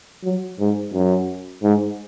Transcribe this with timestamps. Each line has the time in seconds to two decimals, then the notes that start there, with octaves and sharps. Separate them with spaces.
0.24 F#3
0.59 G#2
0.94 F#2
1.63 G#2